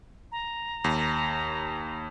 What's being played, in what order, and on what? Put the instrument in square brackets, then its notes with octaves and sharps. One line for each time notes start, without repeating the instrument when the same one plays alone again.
[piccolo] A#5
[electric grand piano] D#2